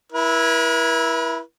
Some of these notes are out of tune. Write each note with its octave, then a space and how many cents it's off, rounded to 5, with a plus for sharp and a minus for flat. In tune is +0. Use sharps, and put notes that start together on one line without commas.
E4 +0 B4 -45